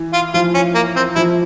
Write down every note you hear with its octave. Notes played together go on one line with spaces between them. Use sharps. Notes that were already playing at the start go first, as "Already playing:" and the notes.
Already playing: E3
F4
F3 F4
C#4
A#3
C4
F3 E4